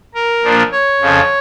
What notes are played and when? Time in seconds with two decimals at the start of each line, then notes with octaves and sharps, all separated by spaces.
0.15 A#4
0.43 A#2 F3 A#3 D4
0.72 C#5
1.01 F2 C#3 F3